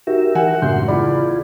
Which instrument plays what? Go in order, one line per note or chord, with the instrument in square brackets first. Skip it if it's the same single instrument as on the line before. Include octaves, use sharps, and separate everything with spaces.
[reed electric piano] D#4 F#4 [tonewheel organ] G4 A#4 E5
[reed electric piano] E3 [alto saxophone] F#5 [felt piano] G#5
[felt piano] A1 F#2 [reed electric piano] C#3 G6 [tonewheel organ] G#3 D4 C6
[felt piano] E2 E3 B5 [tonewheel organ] F4 G#4 [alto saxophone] D5